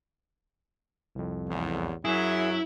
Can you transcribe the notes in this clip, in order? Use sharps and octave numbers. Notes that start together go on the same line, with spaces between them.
C2 F2
A1 E2
F#2 F#3 E4 G#4 E5